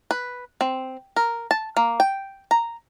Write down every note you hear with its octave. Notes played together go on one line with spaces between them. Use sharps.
B4
C4
A#4
A5
A#3
G5
A#5